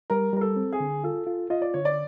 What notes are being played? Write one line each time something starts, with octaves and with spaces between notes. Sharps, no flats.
G3 A#4
G3 A#4
A4
C4
G#4
D3
F4 A4
F4
F4 D#5
D5
D3 C#5
D5